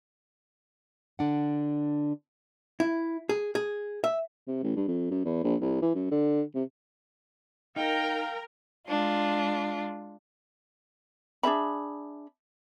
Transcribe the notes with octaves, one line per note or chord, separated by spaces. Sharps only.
D3 D4 F#5
E4
G#4
G#4
E5
C3
A1
G2
F2
F#2
E2
A#1
C2
E3
F#2
D3
C3
D#4 A#4 F5 G5
G#3 D4 F4
D4 G#4 E5 B5